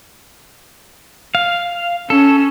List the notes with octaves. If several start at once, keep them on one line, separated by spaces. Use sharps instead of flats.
F5
C#4 A4